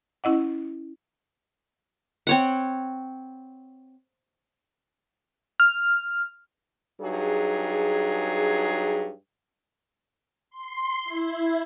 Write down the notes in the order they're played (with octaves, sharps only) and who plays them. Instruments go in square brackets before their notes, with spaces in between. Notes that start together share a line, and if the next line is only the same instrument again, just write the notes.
[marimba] C#4 E4 D#5 F#5
[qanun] C4 C#5 F#5
[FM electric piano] F6
[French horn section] G2 F#3 D#4 G#4
[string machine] C6
E4